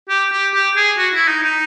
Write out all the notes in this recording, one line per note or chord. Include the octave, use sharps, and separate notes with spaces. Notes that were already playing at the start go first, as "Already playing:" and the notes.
G4
G4
G4
G#4
F#4
E4
D#4
D#4